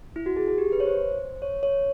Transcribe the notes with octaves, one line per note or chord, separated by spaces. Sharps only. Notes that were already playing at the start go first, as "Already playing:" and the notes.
E4
F#4
G#4
G#4
G4
B4
C#5
C5
C#5
C#5